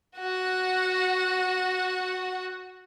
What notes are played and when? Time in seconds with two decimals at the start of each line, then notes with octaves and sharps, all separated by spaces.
0.17 F#4 F#5